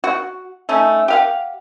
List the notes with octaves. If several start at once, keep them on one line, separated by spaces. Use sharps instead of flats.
F#4
A3 C#4 D#4
G4 F5 F#5